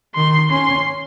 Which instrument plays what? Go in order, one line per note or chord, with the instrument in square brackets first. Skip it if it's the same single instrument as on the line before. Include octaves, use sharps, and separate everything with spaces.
[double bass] D#3 [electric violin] C6
[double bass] C#4 [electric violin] C6